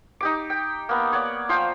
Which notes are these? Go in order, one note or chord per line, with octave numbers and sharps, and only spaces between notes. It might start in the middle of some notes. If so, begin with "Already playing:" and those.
D#4 G4 D6
G5
A#3 B3
C#5 D5 F#5
F3 C5 F5 G5